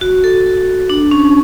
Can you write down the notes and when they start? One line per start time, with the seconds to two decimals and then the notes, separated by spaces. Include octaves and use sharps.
0.01 F#4
0.24 A4
0.90 D4
1.11 C#4